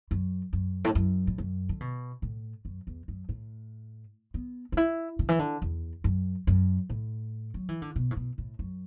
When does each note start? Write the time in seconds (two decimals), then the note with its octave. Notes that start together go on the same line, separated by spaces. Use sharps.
0.11 F#2
0.53 F#2
0.85 A2
0.95 F#2
1.27 A2
1.38 F#2
1.69 D3
1.81 B2
2.22 A2
2.65 F#2
2.87 E2
3.08 F#2
3.29 A2
4.34 B3
4.72 D4
4.77 E4
5.19 D3
5.29 E3
5.39 D3
5.62 E2
6.04 F#2
6.47 F#2
6.90 A2
7.54 F#3
7.69 E3
7.82 D3
7.96 B2
8.11 A2
8.17 B2
8.38 A2
8.59 F#2